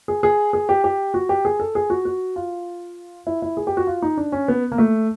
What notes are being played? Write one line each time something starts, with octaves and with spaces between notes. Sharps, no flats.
G#4
G#4
G#4
G4
G4
F#4
G4
G#4
A4
G#4
F#4
F#4
F4
E4
E4
G#4
G4
F#4
F4
D#4
D4
C#4
B3
A#3
A3